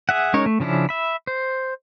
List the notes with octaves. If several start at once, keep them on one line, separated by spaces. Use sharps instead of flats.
G#4 E5 F#5
G#3 C#4 D#4 A#4 C#5
A3
C#3 F3 C#4 D4 E4
E5 B5
C5